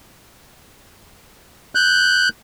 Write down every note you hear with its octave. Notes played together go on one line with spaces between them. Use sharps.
F#6 G6